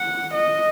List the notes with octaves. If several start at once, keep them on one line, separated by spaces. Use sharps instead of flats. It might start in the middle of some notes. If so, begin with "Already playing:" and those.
Already playing: F#5
D#5